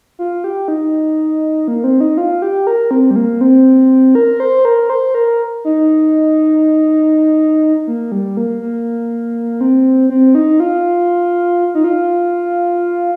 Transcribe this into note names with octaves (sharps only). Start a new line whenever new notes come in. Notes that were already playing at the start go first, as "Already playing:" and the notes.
F4
G4
D#4
A#3
C4
D#4
F4
G4
A#4
C4
G3
A#3
C4
A#4
C5
A#4
C5
A#4
D#4
A#3
G3
A#3
A#3
C4
C4
D#4
F4
D#4
F4